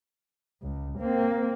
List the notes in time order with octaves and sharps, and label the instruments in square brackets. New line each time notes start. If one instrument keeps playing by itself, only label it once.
[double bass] C#2
A#3 C4